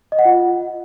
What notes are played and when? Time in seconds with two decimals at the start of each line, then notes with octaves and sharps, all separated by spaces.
0.12 D#5
0.19 F#5
0.25 F4